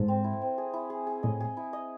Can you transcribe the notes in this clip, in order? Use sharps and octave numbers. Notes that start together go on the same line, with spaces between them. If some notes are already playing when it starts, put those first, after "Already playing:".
Already playing: G#2 A4 C5
C4
E4
C4
G#4
E4
G#4
G#4
A2 D#5
G#4
E4
D#5